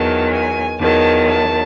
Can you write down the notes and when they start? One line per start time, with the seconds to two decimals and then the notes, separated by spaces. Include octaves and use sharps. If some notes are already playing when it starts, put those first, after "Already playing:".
Already playing: E2 D#3 F#3 A5
0.32 G#5
0.80 E2 D#3 F#3 A5
1.27 A5